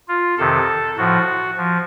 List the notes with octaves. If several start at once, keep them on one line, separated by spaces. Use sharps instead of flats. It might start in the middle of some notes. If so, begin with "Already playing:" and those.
F4
F2 C3 D#3 A4
A2 F3 F#4
F3